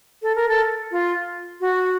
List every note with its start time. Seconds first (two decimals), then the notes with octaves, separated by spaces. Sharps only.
0.22 A4
0.35 A#4
0.49 A4
0.91 F4
1.61 F#4